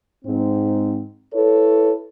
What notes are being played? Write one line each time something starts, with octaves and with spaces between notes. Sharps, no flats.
G#2 C4
E4 A4 B4 C#5